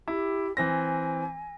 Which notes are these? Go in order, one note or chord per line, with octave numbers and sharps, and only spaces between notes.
E4 G4
E3 C4 G#5 A#6